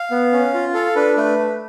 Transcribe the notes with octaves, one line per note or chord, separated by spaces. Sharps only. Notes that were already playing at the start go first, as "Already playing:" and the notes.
Already playing: F5
B3
C#4
F4
A4 F5
D4 B4
A3 B4
A3